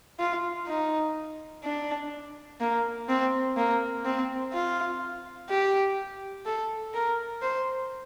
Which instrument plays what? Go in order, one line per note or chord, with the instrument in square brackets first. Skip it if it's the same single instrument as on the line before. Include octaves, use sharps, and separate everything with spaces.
[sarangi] F4
D#4
D4
A#3
C4
A#3
C4
F4
G4
A4
A#4
C5